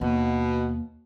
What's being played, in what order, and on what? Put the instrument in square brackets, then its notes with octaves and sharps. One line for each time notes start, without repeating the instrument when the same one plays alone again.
[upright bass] D#2 [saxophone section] B2